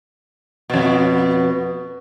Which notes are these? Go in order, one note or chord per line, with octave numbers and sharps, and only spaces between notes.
F2 B2